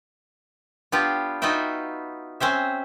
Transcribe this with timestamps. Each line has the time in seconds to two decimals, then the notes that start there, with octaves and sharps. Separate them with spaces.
0.92 B3 D4 F4 G4
1.42 D#4 F4 F#4 B4 E5 G5
2.40 C4 C#4 C5 E5